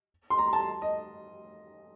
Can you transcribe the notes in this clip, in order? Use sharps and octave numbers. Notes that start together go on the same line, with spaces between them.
C6
A#5
A5
D#5